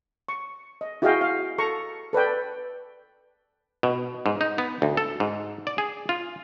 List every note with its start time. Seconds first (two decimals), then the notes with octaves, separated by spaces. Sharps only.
0.28 C#6
0.81 D#5
1.02 E4 F#4 G#4 D#5 F5 G5
1.21 F5
1.58 A4 A#5 C#6
2.13 A4 B4 D5 G5
3.83 B2
4.26 G#2
4.41 D#4
4.58 B3
4.82 D2
4.97 A4
5.20 G#2
5.67 D5
5.78 G#4
6.09 F4